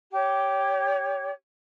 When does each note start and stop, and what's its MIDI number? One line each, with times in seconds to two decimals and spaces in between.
0.12 1.28 67
0.12 1.28 73